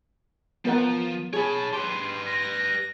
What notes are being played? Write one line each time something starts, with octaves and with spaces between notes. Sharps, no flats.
F3 B3 A#4 F#5
G#4 C#5 A5 B5
G4 B4 C6
A#6